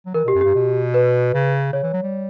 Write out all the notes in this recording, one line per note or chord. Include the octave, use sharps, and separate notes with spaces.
F#3
E3 A#4
B2 G4
F#2
G2 G4
B2
B4
C#3
C#3 C#5
E3
F#3
G3